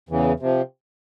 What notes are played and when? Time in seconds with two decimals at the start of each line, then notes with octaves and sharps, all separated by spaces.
0.09 E2 C#3 E3
0.40 C3 F3